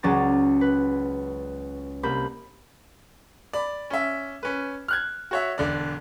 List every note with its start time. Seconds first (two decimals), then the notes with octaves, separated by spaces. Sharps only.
0.03 C#2 F#3 C#4 D5 A#5 A6
0.61 B4
2.03 C2 A#3 B5 G6
3.53 D5 B5
3.90 C#4 E5
4.43 C#4 B4
4.88 F6 F#6 G#6
5.31 F#4 C#5 E5
5.58 E1 D3 D5